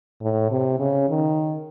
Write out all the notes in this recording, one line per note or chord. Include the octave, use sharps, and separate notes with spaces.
A2
C3
C#3
D#3